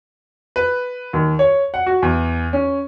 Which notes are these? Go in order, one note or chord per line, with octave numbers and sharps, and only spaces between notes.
B4
D#2
C#5
F#5
F#4
E2
C#4